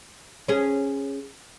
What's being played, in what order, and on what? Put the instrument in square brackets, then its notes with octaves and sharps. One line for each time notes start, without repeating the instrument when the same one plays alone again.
[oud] C#4 G#4